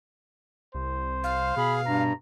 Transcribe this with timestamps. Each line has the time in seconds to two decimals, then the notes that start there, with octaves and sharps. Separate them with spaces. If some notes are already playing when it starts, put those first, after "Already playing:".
0.75 C2 C5
1.24 F5
1.57 B2 G#4 B5
1.86 G2 A#5